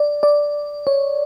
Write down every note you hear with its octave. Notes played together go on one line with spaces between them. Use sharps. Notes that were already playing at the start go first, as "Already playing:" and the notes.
Already playing: D5
D5
C#5